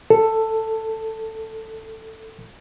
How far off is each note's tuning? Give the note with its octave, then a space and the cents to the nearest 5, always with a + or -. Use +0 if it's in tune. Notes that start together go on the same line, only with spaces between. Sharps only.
A4 +10